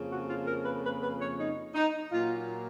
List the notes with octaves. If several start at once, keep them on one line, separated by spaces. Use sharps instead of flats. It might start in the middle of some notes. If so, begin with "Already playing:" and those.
Already playing: F2 C#3 F3 A#3
F#4
F4
A#4
B4
B4
B4
C#5
D#4
D#4
A#2 F#3 A#3 F4